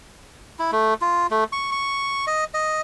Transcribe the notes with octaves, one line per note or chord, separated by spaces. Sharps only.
E4
A3
F4
A3
C#6
C#6
D#5
D#5